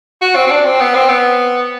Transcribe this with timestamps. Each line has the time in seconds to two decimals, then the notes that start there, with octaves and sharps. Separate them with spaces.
0.22 F#4
0.35 C4
0.47 C4
0.50 D4
0.65 C4
0.80 B3
0.95 C4
1.09 B3